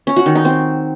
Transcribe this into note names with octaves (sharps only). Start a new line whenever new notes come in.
C#4
F#4
D#3
D#4
C4